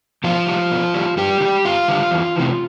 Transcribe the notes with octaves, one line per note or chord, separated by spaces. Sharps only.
B2 F3 F4
G3
B2
G3
G2 G3 G4
D3
G3
G2 F4 F5
D3 G3
E2
C3 E3